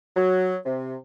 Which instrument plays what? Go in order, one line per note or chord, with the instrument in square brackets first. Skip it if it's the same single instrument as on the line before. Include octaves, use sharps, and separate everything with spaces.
[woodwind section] F#3
C3